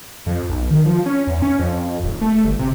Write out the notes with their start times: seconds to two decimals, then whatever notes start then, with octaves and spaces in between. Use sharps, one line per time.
0.26 F2
0.49 B1
0.71 D#3
0.85 F3
1.06 C#4
1.27 E2
1.42 C#4
1.59 F2
2.03 D#1
2.21 A3
2.44 G1
2.59 C3